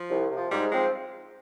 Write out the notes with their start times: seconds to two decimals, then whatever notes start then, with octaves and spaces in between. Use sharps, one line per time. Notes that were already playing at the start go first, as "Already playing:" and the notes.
Already playing: F3
0.10 C2
0.30 C3 F3
0.51 G#2 G3
0.72 F3 G#3 C4